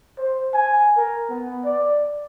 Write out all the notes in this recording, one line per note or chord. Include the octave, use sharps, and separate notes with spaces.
C5
G#5
A#4
B3
D5